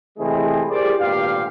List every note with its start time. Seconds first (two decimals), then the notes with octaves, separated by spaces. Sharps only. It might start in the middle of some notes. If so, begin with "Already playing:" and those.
0.18 C3 E3 G#3 A3 C4 G#4
0.70 E4 G4 G#4 A#4 C5 D5
1.00 G#1 D2 G2 A#2 G4 F5